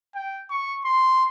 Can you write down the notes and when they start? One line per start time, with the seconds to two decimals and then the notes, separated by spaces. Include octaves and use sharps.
0.15 G5
0.50 C#6
0.85 C6